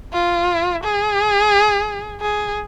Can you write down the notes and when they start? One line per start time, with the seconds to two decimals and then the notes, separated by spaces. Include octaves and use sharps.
0.13 F4
0.84 G#4
2.21 G#4